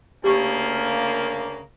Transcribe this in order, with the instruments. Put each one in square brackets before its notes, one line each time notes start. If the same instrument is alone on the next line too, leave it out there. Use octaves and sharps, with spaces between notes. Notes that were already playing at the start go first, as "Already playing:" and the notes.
[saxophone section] D2 C#3 A#3 [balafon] G4 C#6